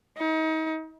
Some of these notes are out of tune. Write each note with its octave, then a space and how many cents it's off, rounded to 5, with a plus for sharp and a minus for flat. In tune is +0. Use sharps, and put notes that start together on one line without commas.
D#4 +35